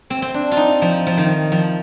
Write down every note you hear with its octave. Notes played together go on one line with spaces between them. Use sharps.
C4
C4
D4
F4
D#4
F3
F3
D#3
F3